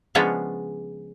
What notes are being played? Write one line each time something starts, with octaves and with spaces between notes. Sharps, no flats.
C#3 F3 G#3 B3 C#4 D4